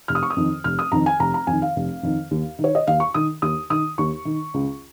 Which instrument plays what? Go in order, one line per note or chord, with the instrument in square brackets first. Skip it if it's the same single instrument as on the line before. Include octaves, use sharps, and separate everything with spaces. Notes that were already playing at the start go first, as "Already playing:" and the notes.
[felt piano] F1 F6
D#6
C#6
D#6
F2 D#3
F1 F6
D#6
F2 D#3 A#5
G#5
F1 A#5
A#5
F2 D#3 G#5
F5
F1
F2 D#3
D#2
D#3
C#5
D#5
D#2 F5
C#6
D#3 D#6
D#2 D#6
D#3 D#6
D#2 C#6
D#3
C#2